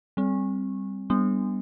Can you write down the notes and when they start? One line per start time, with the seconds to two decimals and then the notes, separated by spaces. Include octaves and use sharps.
0.17 G3 C4
1.10 G3 B3 D4